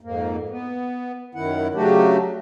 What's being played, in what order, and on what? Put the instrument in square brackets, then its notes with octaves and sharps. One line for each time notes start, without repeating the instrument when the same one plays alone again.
[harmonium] F2 G#2 A#3
B3
F#2 D#3 E4 F#5
C#3 F#3 A3 D4 F#4 G4